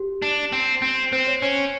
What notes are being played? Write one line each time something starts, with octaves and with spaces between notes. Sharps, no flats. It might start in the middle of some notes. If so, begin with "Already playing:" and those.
Already playing: G4
D4
C4
C4
C4 C5
C#5
C#4 C#5
C#5